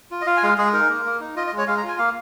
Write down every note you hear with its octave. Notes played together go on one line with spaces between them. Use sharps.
F4
D#5
F4 F5
G#5
G#3 F5
G#3 G#4
D#4 A#4
A#3
A#3
D#4
F4 D#5
D#5
G#3
C#5
G#3 F5
A#5
F4 G#5
A#3 F5